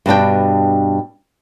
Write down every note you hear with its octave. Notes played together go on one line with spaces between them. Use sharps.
G2 B2 D4 G5